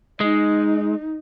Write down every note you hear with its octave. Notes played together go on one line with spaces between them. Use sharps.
G#3 D#4